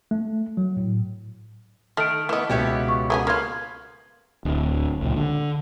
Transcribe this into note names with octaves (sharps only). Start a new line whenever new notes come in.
A3
F#3
A2
D#3 A3 F6 D7
E3 A3 B3 D#5
C#2 B2 B3 G4 C#5 E5
C#6
A3 B3 C#4 G#4
B2 A#3 F4 B4 F6 G#6
D1
C#2 A#2
D3